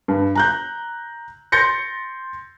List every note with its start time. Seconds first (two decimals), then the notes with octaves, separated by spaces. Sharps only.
0.08 G2
0.35 A#5 F#6 G6
1.52 C6 G6 A6 A#6 C#7